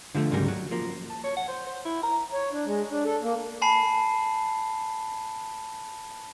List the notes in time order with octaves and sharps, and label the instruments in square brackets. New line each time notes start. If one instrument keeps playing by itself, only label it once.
[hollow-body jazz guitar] D3 F3 G#3 A3
D2 G#2 C#3 F#3 G3 A#4
F#3
F3 A#3
[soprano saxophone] A5
C#5
F#5
C5
C5
E4
A#5
[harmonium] C#5
D4
G#3
D4
A4
A#3
[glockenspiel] G#5 A5 B5 C7